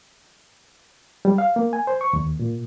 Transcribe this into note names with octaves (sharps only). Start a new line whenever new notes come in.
G3
F5
A#3
G#5
C5
C#6
D#2
A#2